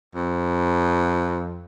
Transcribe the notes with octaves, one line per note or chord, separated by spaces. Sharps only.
F2